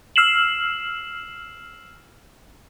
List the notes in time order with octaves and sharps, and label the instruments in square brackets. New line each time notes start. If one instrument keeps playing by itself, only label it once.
[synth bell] E6 F6 C7 E7 F#7